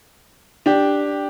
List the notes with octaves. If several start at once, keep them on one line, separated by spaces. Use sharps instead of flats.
D4 G4